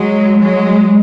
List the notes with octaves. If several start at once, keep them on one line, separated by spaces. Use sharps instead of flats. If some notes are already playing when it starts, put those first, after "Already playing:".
Already playing: F#3 G#3
F#3 G#3